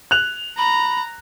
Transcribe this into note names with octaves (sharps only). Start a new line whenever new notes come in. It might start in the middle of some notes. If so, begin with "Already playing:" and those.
F#6 F7
A#5 B5